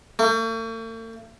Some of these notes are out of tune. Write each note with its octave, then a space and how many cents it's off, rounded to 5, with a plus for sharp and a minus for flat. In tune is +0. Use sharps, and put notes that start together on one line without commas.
A3 +45